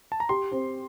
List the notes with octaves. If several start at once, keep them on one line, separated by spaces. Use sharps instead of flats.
A5
A#5
G4 C6
C4